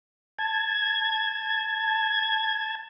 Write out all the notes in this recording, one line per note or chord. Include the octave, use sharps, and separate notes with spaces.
A5 G#6